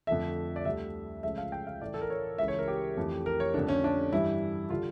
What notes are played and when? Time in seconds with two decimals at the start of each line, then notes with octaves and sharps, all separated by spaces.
0.07 F2 D3 F3 A3 E5
0.56 D5
0.65 D2 D3 G3 E5
1.23 C#2 C#3 F3 A3 E5
1.38 F5
1.52 G5
1.67 F5
1.82 A2 E3 A3 D5
1.94 A4
2.01 A#4
2.10 C#5
2.38 C#2 C#3 E3 E5
2.48 C#5
2.58 A#4
2.68 G4
2.97 F2 E3 A3
3.26 A#4
3.40 C#5
3.54 F2 D3 A3 D4
3.69 C#4
3.84 D4
4.13 G2 E3 G3 E4
4.70 D3 G3 F4